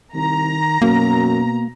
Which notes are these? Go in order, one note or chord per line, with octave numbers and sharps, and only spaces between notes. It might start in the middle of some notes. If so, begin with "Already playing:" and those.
C2 D#3 A#5
F#2 B2 A#3